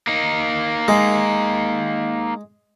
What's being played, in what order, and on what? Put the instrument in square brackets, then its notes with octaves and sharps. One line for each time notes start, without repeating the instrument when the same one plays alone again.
[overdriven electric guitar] A#3 D#4
[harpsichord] G#3